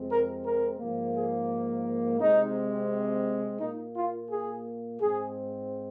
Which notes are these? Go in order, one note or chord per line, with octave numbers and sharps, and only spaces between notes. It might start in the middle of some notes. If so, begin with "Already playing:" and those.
Already playing: F2 C3 G#3 C4
A#4
A#4
G#2 F3 A#3
G#4
C3 G#3 C4 D#4
A#2 A#3 D#4
F4
G#4
G#2 G#3 C4 G#4